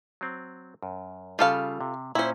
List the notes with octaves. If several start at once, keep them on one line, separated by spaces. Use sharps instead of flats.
F#3 C4
F#2
C#3 G3 F4 A4 F5
C3
A#2 C#4 E4 C5